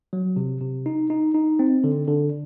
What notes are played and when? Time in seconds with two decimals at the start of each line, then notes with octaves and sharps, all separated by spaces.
0.13 F#3
0.36 C3
0.61 C3
0.86 D#4
1.10 D#4
1.34 D#4
1.59 C4
1.84 D3
2.08 D3